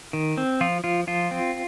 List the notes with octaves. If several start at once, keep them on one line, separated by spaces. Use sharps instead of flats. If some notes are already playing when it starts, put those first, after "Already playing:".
D#3
C4
F3 F4
F3 F4
F3 F4
C4